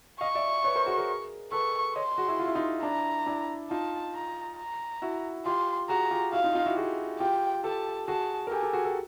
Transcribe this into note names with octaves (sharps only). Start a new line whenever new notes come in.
D#5 F5 C#6
D5 E5
B4 C#5
A#4 C5
F#4 G#4
G#4 A#4
A4 B4 C#6
C#5 D#5 C6
F#4 G#4
E4 F#4
F4
E4
D#4 F4
D4 E4 A#5
D4 E4
D#4 F4 A5
A#5
A#5
E4 F#4
F4 G4 C6
F#4 G#4 A#5
F4 G4
E4 F#4 F5
D#4 F4
D#4 F4
E4 F#4
G4
F#4 G#4
F4 G4 G5
G4 A4 A5
F#4 G#4 A5
A#4
G4 A4 G#5
G4 A4
F#4 G#4
G4 A4